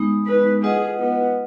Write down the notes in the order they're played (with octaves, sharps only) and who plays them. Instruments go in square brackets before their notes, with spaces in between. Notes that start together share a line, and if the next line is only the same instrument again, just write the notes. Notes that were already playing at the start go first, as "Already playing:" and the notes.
Already playing: [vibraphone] G#3 B3 D#4
[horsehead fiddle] B4
[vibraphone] F4 B4 D#5 F#5 [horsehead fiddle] G#4
[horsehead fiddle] B3